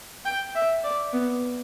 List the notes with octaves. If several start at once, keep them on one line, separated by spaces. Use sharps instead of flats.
G5
E5
D5
B3